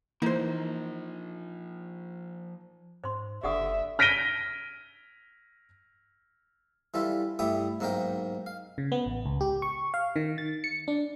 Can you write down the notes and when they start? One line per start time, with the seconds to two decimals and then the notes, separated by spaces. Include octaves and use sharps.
0.22 E3 F3 A#3 D#4 A#4 C5
3.04 G#2 C5 C6
3.43 F#1 D3 G4 E5 F#5 D#6
3.99 F6 A#6 B6 D7 D#7 G7
6.94 E3 G3 F4 A4
7.39 G2 A3 E4 G4 G5 D#6
7.80 B1 G#2 A#3 D#4 A#4 G5
8.46 F5
8.78 C#3
8.92 B3
9.06 A1
9.26 C#2
9.41 G4
9.62 C#6
9.94 F5
10.16 D#3
10.38 A6
10.64 C#7
10.88 D4